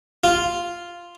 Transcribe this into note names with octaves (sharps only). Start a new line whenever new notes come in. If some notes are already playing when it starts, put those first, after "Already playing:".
F4